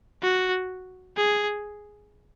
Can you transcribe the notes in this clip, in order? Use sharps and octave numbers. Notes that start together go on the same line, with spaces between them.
F#4
G#4